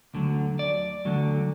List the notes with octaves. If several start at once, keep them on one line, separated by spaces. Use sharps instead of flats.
D2 D3 F#3
D5
D2 D3 F#3